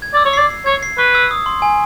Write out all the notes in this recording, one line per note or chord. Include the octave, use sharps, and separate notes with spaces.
G#6
D5 E6
C#5
D5 C7
C7
C#5 G#6
C7
B4 C#6
E6
D#6
C6
G#5